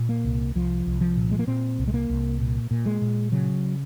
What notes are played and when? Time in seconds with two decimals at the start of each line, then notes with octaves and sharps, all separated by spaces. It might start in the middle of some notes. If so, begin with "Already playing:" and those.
Already playing: A#2
0.09 A#3
0.24 C2
0.55 C2 F3
0.86 C2
1.01 F3
1.17 A#2
1.31 G#3
1.39 A#3
1.47 A#2 C4
1.79 C2
1.88 G#3
1.94 A#3
2.10 C2
2.40 A#2
2.71 A#2
2.86 G#3
3.01 A#2
3.32 C#3 F#3